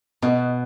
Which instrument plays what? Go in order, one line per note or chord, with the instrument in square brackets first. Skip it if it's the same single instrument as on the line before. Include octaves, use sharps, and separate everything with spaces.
[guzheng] B2 [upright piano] B3